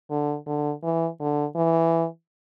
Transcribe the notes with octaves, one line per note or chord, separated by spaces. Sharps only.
D3
D3
E3
D3
E3